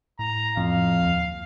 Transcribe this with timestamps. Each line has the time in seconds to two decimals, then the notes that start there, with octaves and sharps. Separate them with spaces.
0.19 A2 A#5
0.57 F2 A2 F5
1.02 D#2